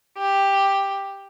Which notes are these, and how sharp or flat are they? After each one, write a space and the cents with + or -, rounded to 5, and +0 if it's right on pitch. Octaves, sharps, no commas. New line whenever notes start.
G4 +5